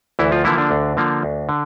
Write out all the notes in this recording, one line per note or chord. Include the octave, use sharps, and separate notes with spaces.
D2 E3 E4
F3 F4
D3 E3 F3 A#3 E4
D3 D4
D2
D3 F3 A#3
D2
D3